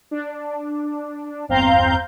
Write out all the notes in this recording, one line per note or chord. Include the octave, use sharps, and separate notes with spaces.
D4
G1 E2 C4 F5 A#5 G6